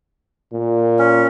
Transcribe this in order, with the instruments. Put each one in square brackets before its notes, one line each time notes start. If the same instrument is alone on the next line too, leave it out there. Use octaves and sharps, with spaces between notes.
[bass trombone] A#2
[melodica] C#4